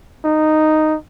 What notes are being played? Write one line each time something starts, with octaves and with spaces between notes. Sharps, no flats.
D#4